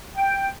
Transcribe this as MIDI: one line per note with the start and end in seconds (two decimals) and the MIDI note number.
0.16 0.47 79